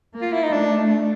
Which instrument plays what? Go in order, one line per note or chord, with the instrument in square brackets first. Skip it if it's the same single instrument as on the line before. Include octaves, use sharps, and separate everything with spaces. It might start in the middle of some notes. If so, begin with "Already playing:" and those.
[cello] A#3
[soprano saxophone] F4
E4
D#4
[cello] A3 [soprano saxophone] D4